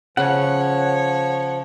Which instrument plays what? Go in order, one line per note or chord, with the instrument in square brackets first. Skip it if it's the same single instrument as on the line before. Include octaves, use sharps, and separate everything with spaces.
[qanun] C#3 [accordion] F3 [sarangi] C#5 [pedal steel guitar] F#5